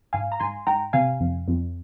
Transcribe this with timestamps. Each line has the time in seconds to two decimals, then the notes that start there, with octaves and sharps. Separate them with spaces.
0.13 G#2 F5 G#5
0.32 A#5
0.40 G#2 G#5 C6
0.67 G#2 G5 A#5
0.93 C3 F5 G#5
1.20 F2
1.48 F2